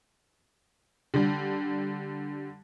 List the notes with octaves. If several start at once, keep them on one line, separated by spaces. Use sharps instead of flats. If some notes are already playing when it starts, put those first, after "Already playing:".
D3 G3